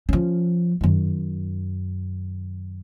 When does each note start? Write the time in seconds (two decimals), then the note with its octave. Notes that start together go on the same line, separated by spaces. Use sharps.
0.09 F3 C#4
0.81 F#2 D#3